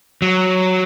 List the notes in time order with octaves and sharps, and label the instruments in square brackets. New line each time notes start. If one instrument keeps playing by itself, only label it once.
[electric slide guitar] F#3